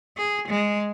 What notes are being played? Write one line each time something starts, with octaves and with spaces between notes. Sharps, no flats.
G#4
G#3